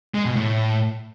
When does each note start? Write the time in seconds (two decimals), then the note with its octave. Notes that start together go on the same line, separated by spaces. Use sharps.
0.14 G#3
0.25 B2
0.36 A2